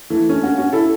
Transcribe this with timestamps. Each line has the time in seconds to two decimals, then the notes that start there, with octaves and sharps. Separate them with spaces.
0.10 E3 A3
0.29 A3 C#4
0.43 C#4 F#4
0.58 C#4 F#4
0.73 E4 A4